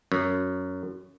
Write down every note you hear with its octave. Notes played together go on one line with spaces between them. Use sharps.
F#2